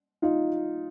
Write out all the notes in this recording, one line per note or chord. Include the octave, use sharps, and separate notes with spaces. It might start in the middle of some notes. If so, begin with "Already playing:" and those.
D#4 F4